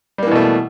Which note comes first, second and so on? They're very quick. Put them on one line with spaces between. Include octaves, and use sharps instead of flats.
G3 A#3 E3 B2 A3